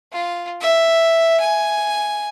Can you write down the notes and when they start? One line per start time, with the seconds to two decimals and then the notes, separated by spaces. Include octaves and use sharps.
0.13 F4
0.61 E5
1.41 G#5